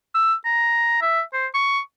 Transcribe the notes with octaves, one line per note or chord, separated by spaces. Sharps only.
E6
A#5
E5
C5
C#6